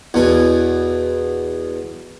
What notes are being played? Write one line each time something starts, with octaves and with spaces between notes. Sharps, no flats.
E2 B2 G#5